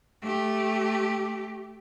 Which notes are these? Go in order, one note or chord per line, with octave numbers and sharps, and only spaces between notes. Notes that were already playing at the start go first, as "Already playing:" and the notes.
A3 G4